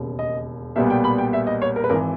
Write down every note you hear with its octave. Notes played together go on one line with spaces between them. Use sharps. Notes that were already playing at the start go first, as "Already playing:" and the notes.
Already playing: E1 D#2 C#3
D#5
B1 A#2 G3 B3 E5
G5
B5
G5
E5
D#5
C#5
A#4
B4
G#1 E3 A#4